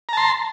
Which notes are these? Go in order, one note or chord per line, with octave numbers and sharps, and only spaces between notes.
A5 A#5 C6